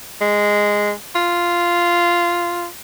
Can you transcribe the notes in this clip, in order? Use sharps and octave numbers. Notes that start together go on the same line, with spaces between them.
G#3
F4